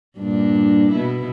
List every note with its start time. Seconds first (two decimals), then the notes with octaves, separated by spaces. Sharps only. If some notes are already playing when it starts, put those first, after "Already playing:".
0.18 G2 A#2 D4
0.91 B2 B3 E4